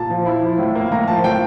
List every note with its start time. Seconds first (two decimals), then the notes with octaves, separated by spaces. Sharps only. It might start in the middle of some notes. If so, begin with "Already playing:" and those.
Already playing: A#2 A5
0.10 F3
0.26 E4
0.43 F3
0.59 A2
0.75 A#3
0.92 A2 A#5
1.08 F3 A5
1.24 A2 G5